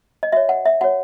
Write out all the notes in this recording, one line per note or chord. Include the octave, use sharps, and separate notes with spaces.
D#5
F#4 C#5 E5
F#5
E5
F#4 C#5 F#5